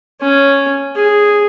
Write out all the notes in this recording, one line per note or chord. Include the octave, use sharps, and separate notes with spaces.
C#4
G#4